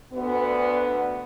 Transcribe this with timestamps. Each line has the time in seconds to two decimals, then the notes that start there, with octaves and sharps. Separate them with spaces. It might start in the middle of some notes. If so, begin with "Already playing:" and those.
0.13 D2 B3